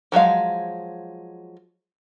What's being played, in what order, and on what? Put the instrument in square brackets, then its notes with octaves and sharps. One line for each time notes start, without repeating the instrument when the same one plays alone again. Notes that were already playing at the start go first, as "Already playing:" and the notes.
[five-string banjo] F3 F#3 G#3 F5